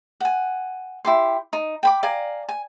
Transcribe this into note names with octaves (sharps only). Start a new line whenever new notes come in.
F#5 G#5
E4 G4 C6
D#4
G5 B5 D6
D5 F5 G#5 A#5
G#5